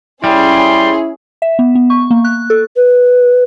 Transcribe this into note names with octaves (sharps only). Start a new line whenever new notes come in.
G3 C#4 E4 G#4 C6
E5
B3
B3
C#6
A#3
F#6
A4
B4